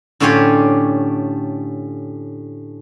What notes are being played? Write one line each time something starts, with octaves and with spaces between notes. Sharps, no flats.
A2 D3 C#4 F4 G4 C#5